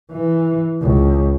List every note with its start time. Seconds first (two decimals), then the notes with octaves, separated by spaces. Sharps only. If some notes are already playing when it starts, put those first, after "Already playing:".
0.11 E3
0.81 C#2